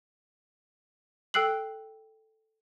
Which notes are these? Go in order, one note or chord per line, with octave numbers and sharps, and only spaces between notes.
A4 G5 E6 F#6 C7 F#7